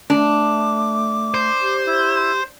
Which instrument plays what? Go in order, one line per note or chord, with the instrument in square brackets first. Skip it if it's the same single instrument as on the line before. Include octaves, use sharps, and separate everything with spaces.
[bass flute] A3 [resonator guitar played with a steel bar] D4 [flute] D6
[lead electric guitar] C5
[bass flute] G4
[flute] E4